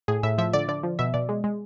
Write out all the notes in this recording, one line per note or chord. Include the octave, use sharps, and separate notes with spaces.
A2 G#4
A2 E5
F3 E5
D3 D5
D3 D5
F3
B2 E5
B2 D5
G#3
G#3